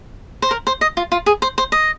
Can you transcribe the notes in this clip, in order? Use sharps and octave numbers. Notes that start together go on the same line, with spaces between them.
C5
A#4
C5
D#5
F4
F4
G#4
C5
C5
D#5